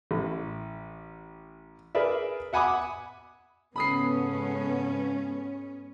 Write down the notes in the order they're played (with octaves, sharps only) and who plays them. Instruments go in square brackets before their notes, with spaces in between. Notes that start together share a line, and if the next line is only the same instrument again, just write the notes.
[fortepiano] A1
G#4 A#4 B4 D5 E5
E5 F#5 G#5 B5 D6 D#6
[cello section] G#2 C#4 [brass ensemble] C#3 A4 [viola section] B3 [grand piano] B5 D#6 C7